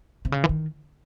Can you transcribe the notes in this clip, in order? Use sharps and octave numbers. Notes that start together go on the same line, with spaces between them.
C3
C#3
E3
D#3